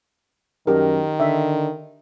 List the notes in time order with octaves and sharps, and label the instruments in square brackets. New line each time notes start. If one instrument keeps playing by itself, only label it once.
[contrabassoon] F#2 [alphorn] D#3 [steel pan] G4 A#4
[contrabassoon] D3 [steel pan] E5